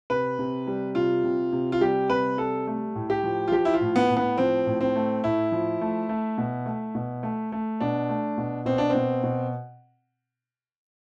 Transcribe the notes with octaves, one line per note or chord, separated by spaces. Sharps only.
C3 B4
C3
G3
C3 F4
C3
C3
F4
G3 G4
C3 B4
G3 A4
A3
A2
G4
F3
F4
F3 G4
E4
F4
A2
B3
A2
B3
F3 C4
A2
C4
A3
A2 E4
F3
A3
A3
B2
A3
B2
A3
A3
B2 D4
A3
B2
B2 C4
D4
B2 C4
B2